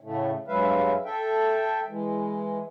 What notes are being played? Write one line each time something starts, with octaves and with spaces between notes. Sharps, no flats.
A2 C#3 A3
G2 F#3 G#3 B4 E5 F5
A4 E5 G5
E3 G#3